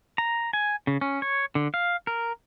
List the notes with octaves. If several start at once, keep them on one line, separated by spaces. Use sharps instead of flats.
A#5
G#5
C#3
C#4
C#5
D3
F5
A#4